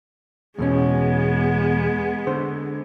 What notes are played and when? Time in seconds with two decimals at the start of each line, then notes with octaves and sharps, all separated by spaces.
0.58 E2 B2 G#3 B3 C#4
2.27 D3 C5